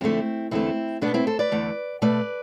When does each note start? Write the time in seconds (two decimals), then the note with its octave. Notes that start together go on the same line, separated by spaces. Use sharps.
0.01 F2 D3 A3 C4 E4
0.51 E2 D3 A3 C4 E4
1.01 B2 A3 B3 D4
1.14 C4 E4
1.27 A4 C5
1.39 B4 D5
1.52 E2 D3 A3
2.02 B2 A3 B4 D5